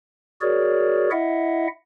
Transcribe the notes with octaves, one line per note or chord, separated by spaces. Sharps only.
F#4 G#4 A#4 C#5 D5
E4 D#5 E5 F#5